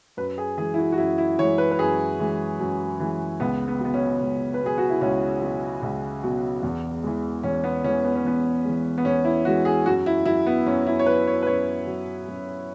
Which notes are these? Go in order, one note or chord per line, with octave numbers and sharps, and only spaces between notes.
F#2 B4
G#4
E3 G#3 G#4
E4
F#4
F#4
F#2 E4
E4
E3 G#3 C#5
B4
B4
F#2 G#4
E3 G#3
F#2
E3 G#3
C#2 B3
B3
B2 F#3 B3
C#4
C#2
B4
B2 F#3 G#4
F#4
E4
C#2 C#4
B2 F#3
C#2
B2 F#3
E2
E3 G#3
E2 C#4
B3
E3 G#3 C#4
B3
C#4
E2 B3
E3 G#3
B3
E2 C#4
E4
E3 G#3 F#4
G#4
F#2 F#4
E4
F#3 E4
B3
F#2 C#4
E4
C#5
F#3 B4
C#5
B4
F#2 C#5
F#3
F#2